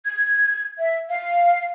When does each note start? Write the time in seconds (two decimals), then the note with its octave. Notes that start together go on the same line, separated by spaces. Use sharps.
0.06 G#6
0.78 E5
1.11 F5